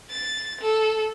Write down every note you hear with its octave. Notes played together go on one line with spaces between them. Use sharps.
A6
A4